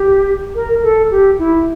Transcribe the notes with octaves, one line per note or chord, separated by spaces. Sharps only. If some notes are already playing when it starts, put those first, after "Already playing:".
Already playing: G4
A#4
A4
G4
E4